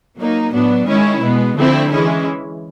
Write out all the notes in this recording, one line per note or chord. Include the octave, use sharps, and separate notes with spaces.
F#3 A#3 D#4
A2 F#3 B3 D4
D#3 G#3 C#4 E4
B2 G#3 B3
D3 F3 A3 C4 E4
E3 G#3 C#4 E4